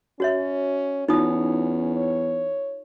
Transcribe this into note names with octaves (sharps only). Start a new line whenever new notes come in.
C#4 F#4 C#5 E5
E2 C#4 D#4 F4 D#6
C#5